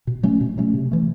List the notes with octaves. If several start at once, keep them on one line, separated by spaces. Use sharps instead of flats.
B2
F#3 A3 C#4
B2
F#3 A3 C#4
C3
E3 A3